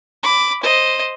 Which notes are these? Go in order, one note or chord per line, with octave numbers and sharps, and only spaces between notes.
B5 D6
C5 D#5